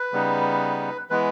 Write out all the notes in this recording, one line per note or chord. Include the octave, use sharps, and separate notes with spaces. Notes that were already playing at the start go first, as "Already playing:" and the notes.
Already playing: B4
C#3 G3 B3 D#4
E3 G#3 B3 B4